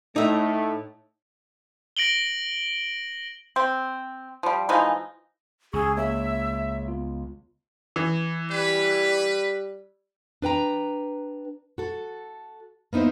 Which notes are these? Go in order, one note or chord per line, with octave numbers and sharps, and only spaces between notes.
A2 A3 D#4 E5
A#6 D7 F#7 G7
C4
F3 G3
E3 F3 G#3 D#4
C#2 G#4 C#6 E6
A#3 G#4 C#5 E5
B3 F4
E3
G3 B4
D4 B4 G5 A#5
F#4 A4
A#3 B3 D#4 E4 C5